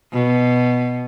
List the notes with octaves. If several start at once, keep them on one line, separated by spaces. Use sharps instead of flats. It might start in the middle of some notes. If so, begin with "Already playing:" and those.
B2